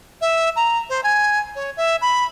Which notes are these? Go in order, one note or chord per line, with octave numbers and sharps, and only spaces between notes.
E5
A#5
C5
G#5
C#5
E5
B5